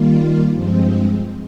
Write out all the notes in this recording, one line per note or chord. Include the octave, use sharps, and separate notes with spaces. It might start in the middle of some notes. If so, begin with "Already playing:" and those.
Already playing: D#3 G3 A#3 F4
G2 F3 G#3 C4